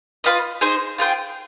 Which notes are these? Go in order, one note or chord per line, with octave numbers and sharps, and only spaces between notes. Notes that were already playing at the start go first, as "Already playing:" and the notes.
F4 B4 D#5
D#4 G#4 C5
F4 G#4 C5 G5